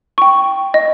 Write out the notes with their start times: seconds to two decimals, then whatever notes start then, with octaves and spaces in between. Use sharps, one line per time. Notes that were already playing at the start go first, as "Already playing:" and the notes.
0.18 G5 C#6
0.74 D#5